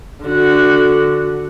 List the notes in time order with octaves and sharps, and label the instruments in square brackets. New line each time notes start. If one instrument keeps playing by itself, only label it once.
[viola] D3 F#4